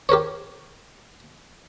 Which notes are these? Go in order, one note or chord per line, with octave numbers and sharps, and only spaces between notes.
G4 A#4 C5 C#5